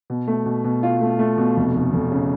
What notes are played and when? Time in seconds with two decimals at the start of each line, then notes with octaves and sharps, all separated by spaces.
0.10 B2
0.28 A3
0.46 B2
0.64 B2
0.83 F4
1.01 A3
1.19 A3
1.38 B2
1.57 F1
1.75 F1
1.93 F1
2.12 C#3